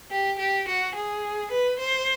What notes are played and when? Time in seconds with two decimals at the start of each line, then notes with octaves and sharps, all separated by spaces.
0.11 G4
0.39 G4
0.68 F#4
0.95 G#4
1.51 B4
1.79 C5